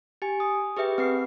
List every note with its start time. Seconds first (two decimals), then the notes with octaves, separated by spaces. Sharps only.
0.22 G4 G#5
0.40 D#6
0.77 G4 G#4 B4 E5 G5
0.98 C4 B4 C7